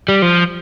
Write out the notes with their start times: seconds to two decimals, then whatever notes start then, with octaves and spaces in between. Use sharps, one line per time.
0.09 G3
0.22 F3